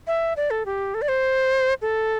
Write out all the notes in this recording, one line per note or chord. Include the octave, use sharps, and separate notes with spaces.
E5
D5
A4
G4
A4
D5
C5
A4